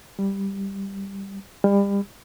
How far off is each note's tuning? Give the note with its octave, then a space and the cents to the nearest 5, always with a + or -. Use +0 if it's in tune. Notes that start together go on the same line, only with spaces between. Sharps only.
G3 +5
G3 +35